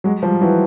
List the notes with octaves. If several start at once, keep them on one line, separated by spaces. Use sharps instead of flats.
F#3 G#3
F3 G3
E3 F#3